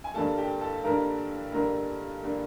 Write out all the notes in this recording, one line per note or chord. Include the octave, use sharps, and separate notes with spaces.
G#5
G2 D3 G3 A#3 A4 A5
G4 G5
A4 A5
G2 D3 G3 A#3 A#4 A#5
G2 D3 G3 A#3 A#4 A#5
D3 G3 A#3